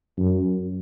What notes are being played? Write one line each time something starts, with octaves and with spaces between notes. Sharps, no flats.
F#2